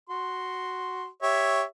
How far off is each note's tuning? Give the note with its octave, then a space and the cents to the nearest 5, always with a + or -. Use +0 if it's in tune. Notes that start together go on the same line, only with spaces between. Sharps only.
F#4 +0 C6 +0
G4 +0 C#5 +0 E5 +0